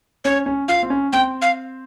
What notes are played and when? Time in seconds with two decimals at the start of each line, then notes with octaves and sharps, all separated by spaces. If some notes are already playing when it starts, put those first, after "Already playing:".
0.25 C#4 C#5
0.46 C#4
0.68 F4 F5
0.83 C4
0.90 C#4
1.13 C4 G5
1.42 F5